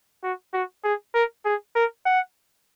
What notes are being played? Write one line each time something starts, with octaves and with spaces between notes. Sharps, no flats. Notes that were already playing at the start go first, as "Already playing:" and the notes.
F#4
F#4
G#4
A#4
G#4
A#4
F#5